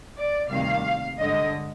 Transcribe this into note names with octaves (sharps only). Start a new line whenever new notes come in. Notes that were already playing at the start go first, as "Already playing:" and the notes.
D5
D2 C3 D#3 G3 A#3 F5
G2 D3 G#3 D#5